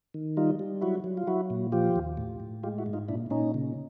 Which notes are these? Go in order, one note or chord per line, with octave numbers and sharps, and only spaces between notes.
D#3
G3 D#4 F4
G3
F#3 E4 F#4
F#3
F4
F#3 E4 F#4
A#2
F3 F4 G4
D#2
A2
A2
G#3 F4 G4
E4 F#4
G#2
D#4 F4
A#2 D4 E4
A#2 C#4 D#4
C#3